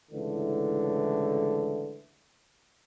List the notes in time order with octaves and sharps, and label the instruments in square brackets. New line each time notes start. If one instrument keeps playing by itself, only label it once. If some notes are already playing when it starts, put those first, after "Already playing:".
[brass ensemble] C#2 A2 D3 E3